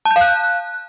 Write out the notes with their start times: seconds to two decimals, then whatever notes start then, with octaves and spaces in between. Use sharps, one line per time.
0.05 A5
0.11 G6
0.16 F5
0.21 F#6